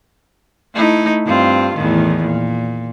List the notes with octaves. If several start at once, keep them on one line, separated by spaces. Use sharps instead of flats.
A3 D#4 E4
G2 C4 F4
E2 A2 D#3
A#2